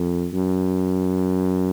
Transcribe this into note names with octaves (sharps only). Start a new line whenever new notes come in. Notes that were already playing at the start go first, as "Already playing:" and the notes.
Already playing: F2
F#2